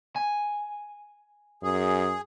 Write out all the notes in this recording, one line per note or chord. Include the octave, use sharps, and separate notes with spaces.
G#5
F#2 G#4